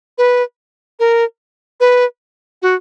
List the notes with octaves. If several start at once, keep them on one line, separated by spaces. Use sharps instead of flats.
B4
A#4
B4
F#4